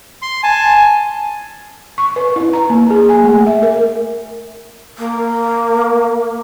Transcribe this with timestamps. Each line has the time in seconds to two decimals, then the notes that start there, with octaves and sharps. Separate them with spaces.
0.22 C6
0.43 G#5 A5
1.98 C#6
2.16 B4
2.36 E4
2.53 A#5
2.70 A#3
2.90 G#4
3.09 G#5
3.24 A3
3.46 E5
3.62 A#4
4.98 A#3